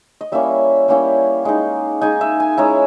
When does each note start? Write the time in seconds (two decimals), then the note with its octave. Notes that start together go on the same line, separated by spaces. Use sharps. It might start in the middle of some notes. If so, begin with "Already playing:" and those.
0.21 D#5
0.32 G3 A#3 C#4 E4 E5
0.88 G3 A#3 C#4 E4 G5
1.45 G#3 D#4
2.01 G#3 D#4 G#5
2.21 E5
2.40 G#5
2.57 G#3 C#4 E4 A#5